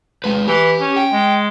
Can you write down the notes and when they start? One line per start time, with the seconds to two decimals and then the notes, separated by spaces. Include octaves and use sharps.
0.24 G#3 B4
0.48 E3 G4
0.79 C#4
0.96 G5
1.13 G#3